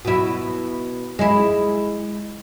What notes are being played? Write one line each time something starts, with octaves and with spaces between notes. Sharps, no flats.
B2 E4
G#3 E4